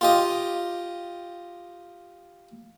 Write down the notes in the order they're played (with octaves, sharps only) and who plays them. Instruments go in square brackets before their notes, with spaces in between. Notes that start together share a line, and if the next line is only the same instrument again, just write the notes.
[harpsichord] F4 G4 D#5